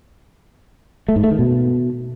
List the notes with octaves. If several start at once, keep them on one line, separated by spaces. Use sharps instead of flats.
A3
G#2
A3
D#3
B2